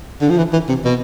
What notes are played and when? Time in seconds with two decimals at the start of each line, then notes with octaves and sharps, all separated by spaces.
0.21 D3
0.29 F3
0.37 E3
0.53 E3
0.69 C3
0.85 B2